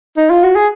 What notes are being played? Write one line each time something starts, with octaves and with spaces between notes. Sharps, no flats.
D#4
F4
F#4
G#4